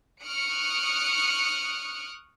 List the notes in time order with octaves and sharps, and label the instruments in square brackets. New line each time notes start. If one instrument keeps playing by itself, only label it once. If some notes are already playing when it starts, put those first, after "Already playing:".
[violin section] C#6 D#6 F6 F#6 C#7 D7